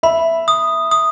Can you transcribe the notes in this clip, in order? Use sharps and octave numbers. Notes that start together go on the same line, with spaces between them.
E5 B5
D#6
D#6